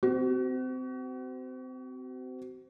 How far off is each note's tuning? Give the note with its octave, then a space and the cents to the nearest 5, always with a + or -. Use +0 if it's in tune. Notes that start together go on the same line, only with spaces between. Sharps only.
C4 -25 F#4 +35